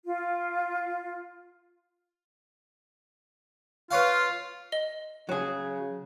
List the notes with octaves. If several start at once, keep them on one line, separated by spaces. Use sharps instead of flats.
F4
F4 B4 C#5 F5
D#5 G7
C#3 F#3 G#4